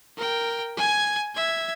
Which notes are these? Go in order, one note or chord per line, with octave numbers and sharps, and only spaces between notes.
A#4 G5
G#5 G#6
E5 G#6